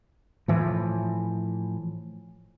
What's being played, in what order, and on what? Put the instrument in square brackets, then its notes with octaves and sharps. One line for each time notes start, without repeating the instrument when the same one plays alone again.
[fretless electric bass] A2 E3 F3